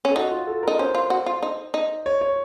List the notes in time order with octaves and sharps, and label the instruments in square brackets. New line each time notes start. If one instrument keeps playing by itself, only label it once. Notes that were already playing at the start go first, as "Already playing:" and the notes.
[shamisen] C#4
[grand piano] A4
[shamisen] D#4 [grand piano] F#4
[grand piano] F4
A4
[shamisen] D#4 [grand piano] A#4
[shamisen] C#4 [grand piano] C5
[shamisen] F4
F#4
F4
D#4
D#4
[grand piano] C#5
C#5